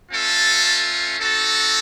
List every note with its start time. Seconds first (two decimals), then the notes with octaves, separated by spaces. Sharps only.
0.12 A3 C#4 F4 A4
1.20 C4 D#4 F#4 A4